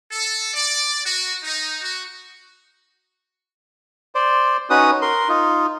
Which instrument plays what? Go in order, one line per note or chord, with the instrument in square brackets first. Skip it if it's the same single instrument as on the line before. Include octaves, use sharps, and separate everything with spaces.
[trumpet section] A4
D5
F#4
D#4
F#4
[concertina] C5 D5
C#4 D#4 F#4 B4 D#6
A#4 C6
D#4 F4